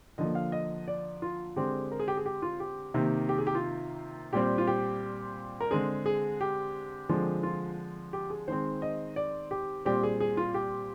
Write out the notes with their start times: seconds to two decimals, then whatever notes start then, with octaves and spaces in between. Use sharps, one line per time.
0.18 D3 F3 A#3 D#5
0.35 F5
0.52 D#5
0.88 D5
1.22 F4
1.56 D3 G#3 C4 G4
1.92 A#4
2.00 G#4
2.08 G4
2.17 G#4
2.26 G4
2.42 F4
2.60 G4
2.94 C3 D#3 A#3
3.29 G4
3.38 G#4
3.47 G4
3.55 F4
4.33 A#2 G3 C4 G4
4.58 F4
4.67 G4
5.61 A#4
5.71 D3 G#3 C4 G#4
6.06 G#4
6.41 G4
7.09 D3 F3 G#3 C4
7.43 F4
8.13 G4
8.30 G#4
8.48 D#3 G#3 C4 C5
8.82 D#5
9.16 D5
9.51 G4
9.85 A#2 G3 C4 G4
10.03 G#4
10.20 G#4
10.37 F4
10.54 G4